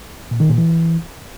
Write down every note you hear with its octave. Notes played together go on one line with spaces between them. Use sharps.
A#2
D#3
A#2
E3